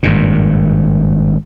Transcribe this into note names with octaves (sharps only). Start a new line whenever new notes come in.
G#1 G2 A#2